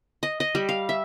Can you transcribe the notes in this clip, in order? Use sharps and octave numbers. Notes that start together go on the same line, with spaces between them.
D#5
D#5
G3
F5
E5